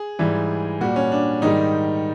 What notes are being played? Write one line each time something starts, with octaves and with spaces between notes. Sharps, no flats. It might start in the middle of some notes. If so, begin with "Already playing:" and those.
Already playing: G#4
G#2 E3 G3
A#2 G3 F#4
C#4
D4
G#2 D#3 G3 D#4